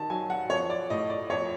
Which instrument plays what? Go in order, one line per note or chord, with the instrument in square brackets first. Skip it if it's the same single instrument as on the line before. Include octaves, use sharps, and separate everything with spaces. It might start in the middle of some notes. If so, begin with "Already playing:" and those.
Already playing: [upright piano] D#3 A5
F#3 G#5
F#5
F3 C#5
D5
A2 D#5
D5
F2 C#5